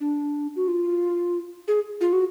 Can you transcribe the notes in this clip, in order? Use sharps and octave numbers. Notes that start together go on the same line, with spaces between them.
D4
F#4
F4
G#4
F4
F#4